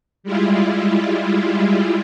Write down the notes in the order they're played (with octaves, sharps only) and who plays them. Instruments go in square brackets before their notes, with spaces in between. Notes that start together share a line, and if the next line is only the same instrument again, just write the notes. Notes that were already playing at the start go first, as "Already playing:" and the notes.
[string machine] G3 G#3 E4 F4